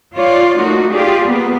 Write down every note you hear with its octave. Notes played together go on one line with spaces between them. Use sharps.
F4 C#5 D5
A3 A#3 D#4 F#4
F4 G4 G#4 D5
A#3 B3